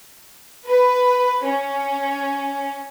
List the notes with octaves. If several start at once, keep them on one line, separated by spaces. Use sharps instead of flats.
B4
C#4